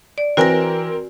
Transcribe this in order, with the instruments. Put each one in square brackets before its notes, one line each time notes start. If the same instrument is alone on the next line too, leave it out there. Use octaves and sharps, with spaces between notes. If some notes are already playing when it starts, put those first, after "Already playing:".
[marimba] D5
[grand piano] E3 [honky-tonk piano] C4 A#4 [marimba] F#4 G#5 A#6